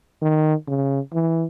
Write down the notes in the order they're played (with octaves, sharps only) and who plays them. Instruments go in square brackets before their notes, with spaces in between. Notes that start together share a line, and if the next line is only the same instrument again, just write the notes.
[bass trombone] D#3
C#3
E3